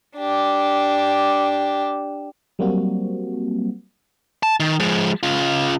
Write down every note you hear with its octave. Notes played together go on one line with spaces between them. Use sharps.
D4 G4
F#3 G3 A#3 C4 F#4
A5
D#3
F3 G#3
C#3 F4